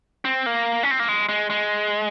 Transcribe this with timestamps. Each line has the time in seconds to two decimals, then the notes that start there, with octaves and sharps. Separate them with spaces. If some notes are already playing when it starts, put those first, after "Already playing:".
0.25 C4
0.46 A#3
0.83 C#4
0.91 C4
0.99 A#3
1.09 G#3
1.29 G#3
1.50 G#3